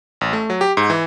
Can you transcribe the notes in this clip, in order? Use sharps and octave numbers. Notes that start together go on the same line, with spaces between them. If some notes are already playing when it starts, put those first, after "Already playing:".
A1
A3
F#3
G4
G#2
E3